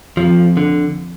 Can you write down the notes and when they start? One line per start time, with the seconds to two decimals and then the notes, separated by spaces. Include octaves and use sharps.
0.17 F2 F3
0.57 D3